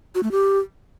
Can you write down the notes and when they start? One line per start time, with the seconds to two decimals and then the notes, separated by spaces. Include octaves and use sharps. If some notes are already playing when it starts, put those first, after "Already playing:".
0.15 F#4
0.23 A3
0.31 G4